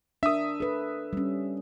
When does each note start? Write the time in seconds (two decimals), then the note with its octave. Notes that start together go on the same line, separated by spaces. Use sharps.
0.23 D4 A#4 E5 D#6
0.60 A4 B4
1.13 G3 C#4